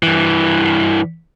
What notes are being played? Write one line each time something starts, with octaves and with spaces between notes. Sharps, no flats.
G2 E3